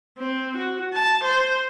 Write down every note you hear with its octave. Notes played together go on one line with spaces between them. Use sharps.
C4
F#4
A5
C5